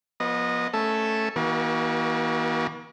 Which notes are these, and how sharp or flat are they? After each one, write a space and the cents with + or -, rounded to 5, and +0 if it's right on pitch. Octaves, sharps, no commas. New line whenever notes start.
F3 +0 B3 -30 D#5 -15
A3 +0 C#4 +0 A4 +0
E3 -35 A#3 +35 F#4 +25